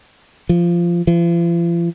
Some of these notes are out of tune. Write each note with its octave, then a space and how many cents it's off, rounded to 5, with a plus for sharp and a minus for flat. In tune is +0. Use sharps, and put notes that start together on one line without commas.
F3 -15
F3 -45